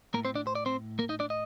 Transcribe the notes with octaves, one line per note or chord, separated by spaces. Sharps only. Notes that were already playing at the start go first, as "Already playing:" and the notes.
A2 A#3 A#4
C4 C5
D4 D5
C5
D5
C4 C5
A#3 A#4
D#4 D#5
D4 D5
D#5